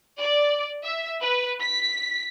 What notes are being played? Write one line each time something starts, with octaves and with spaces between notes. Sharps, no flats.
D5
E5
B4
B6